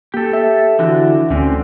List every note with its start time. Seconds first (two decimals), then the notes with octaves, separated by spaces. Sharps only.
0.14 A#3 G4 A4
0.33 E5
0.79 D3 E3 F#4
1.30 D2 D3 C4 C#4